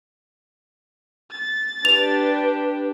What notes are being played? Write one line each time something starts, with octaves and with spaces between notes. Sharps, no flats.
A6
D4 G4 B4 F7